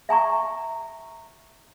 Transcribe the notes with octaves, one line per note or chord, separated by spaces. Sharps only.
E5 G#5 A#5 C#6